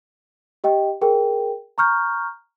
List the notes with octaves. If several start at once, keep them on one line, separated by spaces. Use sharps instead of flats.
G4 D#5 G5
G#4 A#4 G5
A#5 C#6 F6 G6